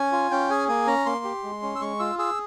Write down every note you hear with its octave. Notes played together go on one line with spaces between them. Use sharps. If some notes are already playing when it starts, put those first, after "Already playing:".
Already playing: C#4 G#5
F4
C#4 G5
G#4 G#5
A#3 G#5
C#4 A#5
A#3 C6
G4
G#3
C#4
E6
G#3 C#6
F4 E6
G#4 E6